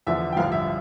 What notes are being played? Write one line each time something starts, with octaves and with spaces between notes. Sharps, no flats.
E2 D3 F3 E5
G5
A1 G2 D3 F3 F5
E5